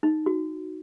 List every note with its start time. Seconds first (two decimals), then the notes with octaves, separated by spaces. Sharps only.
0.03 D#4
0.26 F#4